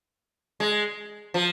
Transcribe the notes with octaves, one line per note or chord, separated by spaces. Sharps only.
G#3
F3